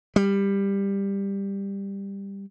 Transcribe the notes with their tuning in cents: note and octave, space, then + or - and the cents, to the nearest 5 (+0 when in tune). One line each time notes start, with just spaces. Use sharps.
G3 +15